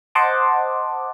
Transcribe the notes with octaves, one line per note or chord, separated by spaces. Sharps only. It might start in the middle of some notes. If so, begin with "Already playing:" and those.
C5 D#5 F#5 A5 C6 D6